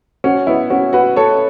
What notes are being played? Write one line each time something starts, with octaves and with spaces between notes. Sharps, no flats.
C#4 F#4
B3 E4
C#4 F#4
F#4 B4
A4 C#5